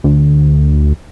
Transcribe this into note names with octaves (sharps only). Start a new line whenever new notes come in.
D2